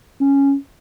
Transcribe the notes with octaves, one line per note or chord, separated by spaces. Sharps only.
C#4